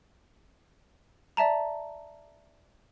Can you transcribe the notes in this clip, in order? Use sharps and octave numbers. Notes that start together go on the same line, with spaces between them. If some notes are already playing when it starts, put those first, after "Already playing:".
D5 E5 A5 A#5